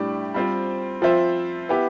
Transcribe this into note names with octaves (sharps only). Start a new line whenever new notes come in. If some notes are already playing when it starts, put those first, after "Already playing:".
Already playing: A2 G3 D4 G4 D5
G3 C4 F4 C5
F3 C4 F4 C5 E5
B3 E4 G4